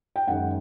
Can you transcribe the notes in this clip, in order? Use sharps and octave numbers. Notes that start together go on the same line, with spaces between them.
G5
F#2 D#3 G#3 F#5